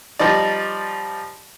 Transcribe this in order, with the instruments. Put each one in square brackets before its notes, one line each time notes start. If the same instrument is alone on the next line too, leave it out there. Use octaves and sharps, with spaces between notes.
[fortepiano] F3 G3 D#4 D5